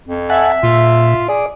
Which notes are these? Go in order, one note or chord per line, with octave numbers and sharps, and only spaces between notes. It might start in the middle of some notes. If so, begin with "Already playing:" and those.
F2
E5 F#5 G#5 A5
A#2 F4
G#4 D5